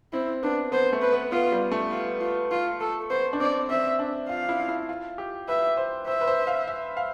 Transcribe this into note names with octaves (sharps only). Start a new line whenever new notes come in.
C4 E4
B3 D4
B3 C5
A3
B4
B3
B3 F4
G3
A3
F4
F4
F4
A4
B3 C5
D4
C4 D5
C4 E5
D4
F4 F5
E4
E4
F4
G4
B4 E5
C5
C5 E5
B4
C5
F5
E5
F5